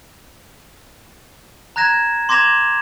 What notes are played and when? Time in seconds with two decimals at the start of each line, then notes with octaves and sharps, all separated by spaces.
1.76 A#5 F#6 G#6 A#6 E7
2.29 C6 D6 G#6 A#6 E7 F7